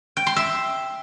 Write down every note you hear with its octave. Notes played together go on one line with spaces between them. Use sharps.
G5
C6
E5